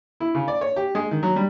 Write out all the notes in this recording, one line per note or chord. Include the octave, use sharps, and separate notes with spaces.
E4
C#3
D5
C#5
G4
G#3
D#3
F#3
G3